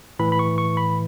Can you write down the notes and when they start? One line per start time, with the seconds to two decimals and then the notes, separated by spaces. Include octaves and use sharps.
0.19 A2 E3 B5
0.32 B5
0.39 C#6
0.58 C#6
0.77 B5